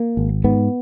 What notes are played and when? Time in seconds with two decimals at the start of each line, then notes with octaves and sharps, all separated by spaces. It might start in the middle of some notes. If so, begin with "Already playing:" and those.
Already playing: A#3
0.17 G#1
0.44 G#2 B3